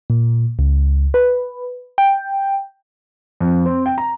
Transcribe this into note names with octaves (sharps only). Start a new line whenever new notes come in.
A#2
C#2
B4
G5
F2
C4
G5
A#5